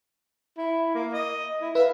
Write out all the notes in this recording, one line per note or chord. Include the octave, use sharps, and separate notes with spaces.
E4
A#3
D#5
E4
B4 E5 F5